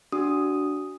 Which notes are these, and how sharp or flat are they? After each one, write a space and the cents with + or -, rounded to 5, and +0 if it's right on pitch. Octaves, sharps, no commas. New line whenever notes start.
D4 -15 F#4 +15 D#6 +0